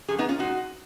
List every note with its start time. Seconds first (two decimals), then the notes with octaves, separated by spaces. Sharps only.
0.08 F#2 F3 G#4
0.19 B3 D#4
0.29 C#4 F4
0.39 A#2 G#3 D#4 F#4